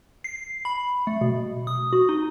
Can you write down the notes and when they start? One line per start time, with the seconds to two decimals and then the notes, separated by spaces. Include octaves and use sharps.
0.24 C7
0.65 B5
1.07 A3
1.21 B2
1.67 D#6
1.93 F#4
2.09 D#4